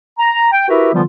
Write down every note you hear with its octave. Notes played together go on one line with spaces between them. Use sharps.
A#5
G5
E4 F#4 G4 A#4 B4 E5
D3 E3 F3 G3 B3 F4